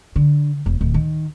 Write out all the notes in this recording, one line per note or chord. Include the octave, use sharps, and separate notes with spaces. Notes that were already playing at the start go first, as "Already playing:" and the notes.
D3
E1
D1
D#3